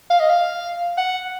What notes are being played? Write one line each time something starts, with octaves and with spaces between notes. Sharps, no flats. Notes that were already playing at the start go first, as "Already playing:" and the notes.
F5
D#5
F5
F#5